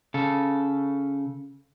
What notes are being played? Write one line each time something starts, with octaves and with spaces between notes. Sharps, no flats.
C#3 A4